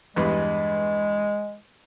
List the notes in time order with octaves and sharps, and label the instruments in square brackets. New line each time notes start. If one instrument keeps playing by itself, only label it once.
[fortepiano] E2 G2 B4 [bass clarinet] G#3